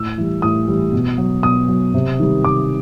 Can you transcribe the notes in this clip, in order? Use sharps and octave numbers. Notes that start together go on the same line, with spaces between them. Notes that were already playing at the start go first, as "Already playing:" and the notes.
Already playing: A2 E6
E3 G3
A2 D#6
E3 G3
B2
F#3
B2 D#6
F#3
C3
D#3 G3
C3 D6